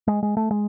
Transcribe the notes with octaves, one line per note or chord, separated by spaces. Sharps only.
G#3
G#3
A3
G#3